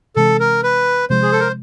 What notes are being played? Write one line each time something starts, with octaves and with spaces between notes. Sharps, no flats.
C3 E3 G#3 C4 A4
A#4
B4
C3 F3 G#3 C5
G#4
A4
A#4